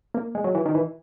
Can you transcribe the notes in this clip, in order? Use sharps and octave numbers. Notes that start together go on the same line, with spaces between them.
A#3
G#3
F#3
E3
D#3
E3